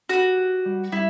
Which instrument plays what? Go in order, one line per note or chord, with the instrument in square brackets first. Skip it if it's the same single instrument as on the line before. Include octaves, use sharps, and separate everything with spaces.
[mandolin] F#4 [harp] G4
[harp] G4
G3
[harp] G3 [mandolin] E4